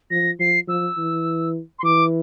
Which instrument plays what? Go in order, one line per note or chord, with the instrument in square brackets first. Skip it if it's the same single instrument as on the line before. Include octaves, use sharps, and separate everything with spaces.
[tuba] F3 [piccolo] A#6
[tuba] F3 [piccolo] C7
[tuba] F3 [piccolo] E6
[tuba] E3
[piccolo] C6
[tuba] E3 [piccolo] D6